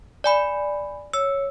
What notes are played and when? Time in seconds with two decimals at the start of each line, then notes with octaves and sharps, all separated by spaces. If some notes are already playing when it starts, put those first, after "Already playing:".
0.24 D5 G#5 B5
1.14 C#5 E6